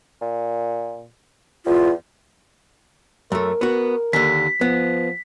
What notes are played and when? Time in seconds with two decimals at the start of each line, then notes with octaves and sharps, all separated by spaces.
0.21 A#2
1.66 E2 F4
3.32 F#2 A3 A#4
3.61 B3 F#4
4.13 D#2 D3 B6
4.61 F3 B3